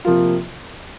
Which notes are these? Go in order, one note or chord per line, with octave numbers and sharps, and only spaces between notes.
C3 F3 A#3 F4